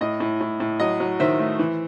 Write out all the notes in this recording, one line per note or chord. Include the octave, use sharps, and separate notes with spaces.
A2 D#5
A2
A2
A2
F#3 D#5
F#3
D#3 C5 E5
A3
E3